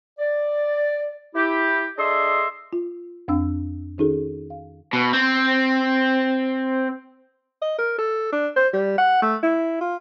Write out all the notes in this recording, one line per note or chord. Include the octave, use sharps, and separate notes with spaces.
D5
E4 G4
D4 G#4 A4 D#5 E5 C6
F4
F2 C4 D4 F5 E6
D#3 C#4 D#4 F#4 G#4 A4
F5
B2
C4
D#5
A#4
A4
D4
C5
G3
F#5
A3
E4
F4